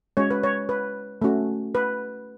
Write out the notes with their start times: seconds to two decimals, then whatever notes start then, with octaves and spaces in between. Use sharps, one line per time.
0.17 G#3 C#4 F#4 C#5
0.31 B4
0.43 C#5
0.69 B4
1.22 A3 C#4 F#4
1.75 B4